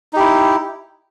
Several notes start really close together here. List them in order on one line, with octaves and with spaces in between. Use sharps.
D#4 G4 E4